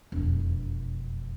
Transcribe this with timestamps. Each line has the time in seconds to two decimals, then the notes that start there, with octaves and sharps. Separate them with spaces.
0.12 E1 F2